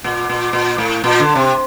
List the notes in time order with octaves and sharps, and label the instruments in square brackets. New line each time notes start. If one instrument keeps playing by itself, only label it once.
[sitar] A#2
A#2
A#2
A2
A#2
D3
C3